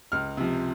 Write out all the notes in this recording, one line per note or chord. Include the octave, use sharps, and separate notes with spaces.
C#2 F6
C3 F3